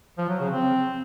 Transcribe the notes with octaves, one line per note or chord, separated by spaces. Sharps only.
F3
F#3
C#3
C4